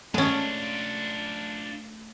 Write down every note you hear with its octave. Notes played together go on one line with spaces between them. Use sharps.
G#3 A3 C#4 D4 F4 A5